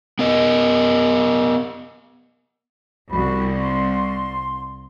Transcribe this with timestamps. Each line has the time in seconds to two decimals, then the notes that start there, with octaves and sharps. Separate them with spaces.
0.19 B3 A#4 D#5
3.11 C2 F#4 B5
3.60 C6